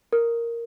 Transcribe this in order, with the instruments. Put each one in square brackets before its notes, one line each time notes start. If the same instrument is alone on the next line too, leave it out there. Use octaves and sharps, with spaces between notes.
[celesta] A#4